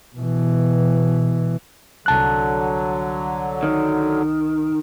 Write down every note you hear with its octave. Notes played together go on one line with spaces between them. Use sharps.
B2 E3
C2 D3 F#3 A5 F#6
D#3